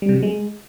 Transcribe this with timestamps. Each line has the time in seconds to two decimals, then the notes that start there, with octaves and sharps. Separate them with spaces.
0.02 G3
0.09 C3
0.16 F#3
0.23 G#3